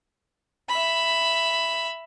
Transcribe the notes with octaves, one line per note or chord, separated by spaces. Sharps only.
E5 B5